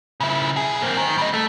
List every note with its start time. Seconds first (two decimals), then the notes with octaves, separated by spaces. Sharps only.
0.20 C#3 E4
0.57 B1 G#4
0.82 A#3 C4
0.97 D#3
1.18 G3 D#5
1.33 A3